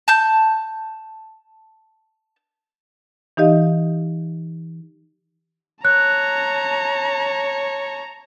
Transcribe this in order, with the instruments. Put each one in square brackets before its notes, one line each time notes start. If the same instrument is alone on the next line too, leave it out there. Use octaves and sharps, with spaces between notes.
[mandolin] A5 G6
[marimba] E3 D#4 G4 D#5 F5
[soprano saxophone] C#5 [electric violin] A5 A#5 [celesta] F#6